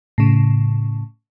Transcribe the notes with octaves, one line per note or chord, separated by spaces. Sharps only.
A2 C#3